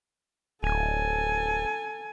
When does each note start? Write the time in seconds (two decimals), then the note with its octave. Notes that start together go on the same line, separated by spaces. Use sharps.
0.63 D1 A4 G#5